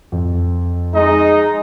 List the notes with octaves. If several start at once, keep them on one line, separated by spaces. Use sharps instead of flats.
F2
G#3 D#4 D#5